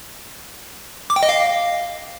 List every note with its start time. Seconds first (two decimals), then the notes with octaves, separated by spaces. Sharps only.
1.10 D6
1.16 G5
1.23 D#5
1.29 F5